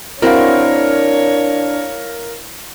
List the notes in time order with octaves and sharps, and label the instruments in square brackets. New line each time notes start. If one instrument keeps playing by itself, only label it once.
[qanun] C4 E4 F#4 [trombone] D4 [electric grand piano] A#4 F5 [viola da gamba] C#5